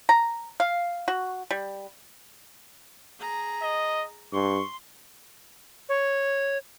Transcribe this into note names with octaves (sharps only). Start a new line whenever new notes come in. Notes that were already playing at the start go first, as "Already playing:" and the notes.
A#5
F5
F#4
G3
G#4 A#5
D#5
G2 C6 C#6
C#5